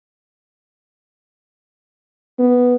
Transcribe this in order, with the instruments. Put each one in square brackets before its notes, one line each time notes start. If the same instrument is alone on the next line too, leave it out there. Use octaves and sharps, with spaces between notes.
[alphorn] B3